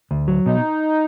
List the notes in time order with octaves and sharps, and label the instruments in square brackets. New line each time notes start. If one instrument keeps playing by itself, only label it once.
[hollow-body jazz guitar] D2
F#3
[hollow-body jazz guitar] B2 [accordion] D#4